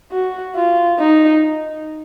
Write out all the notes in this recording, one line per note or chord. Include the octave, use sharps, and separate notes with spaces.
F#4
F4
D#4